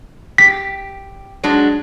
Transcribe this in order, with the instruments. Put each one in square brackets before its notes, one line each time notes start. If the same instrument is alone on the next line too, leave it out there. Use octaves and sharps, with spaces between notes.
[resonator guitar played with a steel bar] G4 [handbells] B6
[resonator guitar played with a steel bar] F#3 G#3 D4